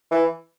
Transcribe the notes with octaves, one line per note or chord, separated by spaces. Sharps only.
E3